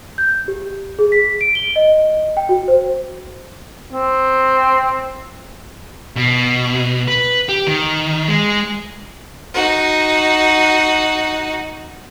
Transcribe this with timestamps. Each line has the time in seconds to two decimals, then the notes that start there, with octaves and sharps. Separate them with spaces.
0.18 G6
0.48 G4
0.99 G#4
1.12 B6
1.41 D7
1.55 G7
1.76 D#5
2.37 G5
2.49 F#4
2.68 C5
3.93 C4
6.16 B2
7.08 B4
7.49 G4
7.67 D#3
8.29 G#3
9.54 D#4 F#4